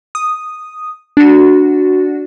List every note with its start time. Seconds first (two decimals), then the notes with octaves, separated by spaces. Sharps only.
0.15 D#6
1.17 D4 F#4